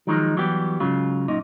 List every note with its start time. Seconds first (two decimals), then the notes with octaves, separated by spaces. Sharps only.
0.07 D#3 F3 F#3 G#3 D#4
0.37 E3 F#3 G3 B3 G4
0.80 G#2 C#3 F#3 F4
1.28 F#2 A#2 D#4